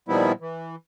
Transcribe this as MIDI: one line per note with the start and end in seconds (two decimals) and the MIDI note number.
0.08 0.32 46
0.08 0.32 51
0.08 0.32 53
0.08 0.32 55
0.08 0.32 59
0.08 0.32 64
0.41 0.76 52